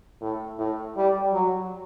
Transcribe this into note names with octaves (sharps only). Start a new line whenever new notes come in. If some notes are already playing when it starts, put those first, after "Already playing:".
A2
A2
G3
F#3